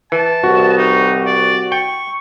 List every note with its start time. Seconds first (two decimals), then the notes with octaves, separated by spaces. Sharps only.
0.12 E3 A5
0.44 C2 F#4
0.78 D#4
1.26 D5
1.72 G5 C#6